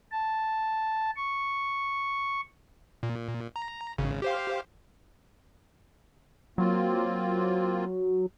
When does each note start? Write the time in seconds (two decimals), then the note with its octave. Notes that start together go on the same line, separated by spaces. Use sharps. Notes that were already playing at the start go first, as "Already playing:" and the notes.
0.11 A5
1.17 C#6
3.03 A#2
3.56 A#5
3.98 G#1 C#3
4.22 G4 C5 F5
6.58 F#3 A#3 C4 F4